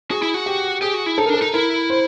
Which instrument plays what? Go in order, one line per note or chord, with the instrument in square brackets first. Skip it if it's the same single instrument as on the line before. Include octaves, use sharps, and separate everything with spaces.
[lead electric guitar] F#4 [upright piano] G#4
[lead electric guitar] E4
F#4
[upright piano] G4
[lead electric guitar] G4 [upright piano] G#4
[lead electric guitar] F#4
E4
[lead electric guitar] D#4 [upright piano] A4
[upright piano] A#4
[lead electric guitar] D4 [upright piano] A4
[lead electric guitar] D#4
[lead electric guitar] E4 [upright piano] A#4
[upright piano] C5